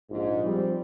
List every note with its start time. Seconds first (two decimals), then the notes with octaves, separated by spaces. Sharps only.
0.10 A#1 G#2
0.44 F3 G3 C4